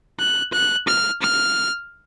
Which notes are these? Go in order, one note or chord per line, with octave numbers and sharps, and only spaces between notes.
F#6
F#6
F6
F6